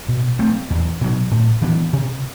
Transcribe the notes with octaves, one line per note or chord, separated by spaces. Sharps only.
B2
A3 C4
E2
B2 F#3
A2
E3 B3 D4
C3